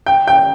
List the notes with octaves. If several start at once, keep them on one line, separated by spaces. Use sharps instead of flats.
G5
G5